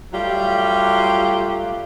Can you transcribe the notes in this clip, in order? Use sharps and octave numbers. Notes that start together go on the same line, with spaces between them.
F#3 G3 A3 F4 G4